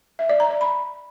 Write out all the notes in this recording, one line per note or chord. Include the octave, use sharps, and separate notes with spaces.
E5
D5
A#5
D5
B5